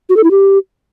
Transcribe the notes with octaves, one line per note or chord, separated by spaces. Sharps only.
F#4
A4
E4
G4